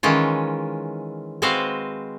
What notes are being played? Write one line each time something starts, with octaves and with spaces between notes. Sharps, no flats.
D#3 E3 G#3 C#4 F4
G#3 C4 F#4 B4 C5 F5